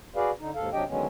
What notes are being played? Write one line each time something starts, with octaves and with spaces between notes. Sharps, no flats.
F#4 G#4 B4 D5 F5
D3 D#4
D#2 G#2 A4 F5
C3 F#3 D4 G4 D#5 G5
D3 D#3 F#3 G#3 B3 C#4